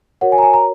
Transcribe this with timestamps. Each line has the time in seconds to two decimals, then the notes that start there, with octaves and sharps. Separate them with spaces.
0.21 F#4 A#4 C#5 F#5
0.32 G#5
0.38 A#5
0.42 G#5
0.53 A#5